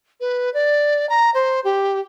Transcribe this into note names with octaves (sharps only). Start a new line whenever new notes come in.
B4
D5
A#5
C5
G4